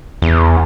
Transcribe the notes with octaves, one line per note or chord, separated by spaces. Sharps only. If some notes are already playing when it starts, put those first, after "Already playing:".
E2